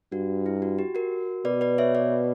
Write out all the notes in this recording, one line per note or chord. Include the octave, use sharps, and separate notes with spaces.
G2 F#4
E4
F#4
G4
F#4 A#4
B2 B4 D5
B4 D5
C#5 E5
B4 D5